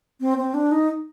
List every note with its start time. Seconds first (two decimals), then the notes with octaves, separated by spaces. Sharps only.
0.21 C4
0.38 C4
0.54 D4
0.71 D#4